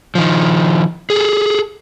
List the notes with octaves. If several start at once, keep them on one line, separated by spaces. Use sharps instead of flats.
D#3 F3
G#4 A4